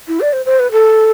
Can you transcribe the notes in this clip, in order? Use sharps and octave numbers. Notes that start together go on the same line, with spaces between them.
E4
D5
C5
C5
B4
A4